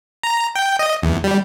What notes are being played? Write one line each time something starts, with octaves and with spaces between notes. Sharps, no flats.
A#5
G5
D#5
E2
G3